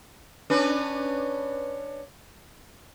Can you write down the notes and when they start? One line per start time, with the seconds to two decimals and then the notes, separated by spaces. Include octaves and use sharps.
0.50 C#4 D4 B4